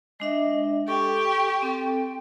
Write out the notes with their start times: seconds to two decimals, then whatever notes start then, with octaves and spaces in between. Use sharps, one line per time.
0.20 G#3 D4 D#5 E5
0.88 G4 A4 C#6
1.62 C4 A4 G5